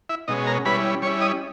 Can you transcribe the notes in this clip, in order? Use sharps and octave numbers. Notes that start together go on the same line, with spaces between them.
E4 E5
B2 G#3 C#4 D#4 D#5
A#4 A#5
G3 C#4 E4 B4 B5
G3 C#4 E4 C#5 C#6
D#5 D#6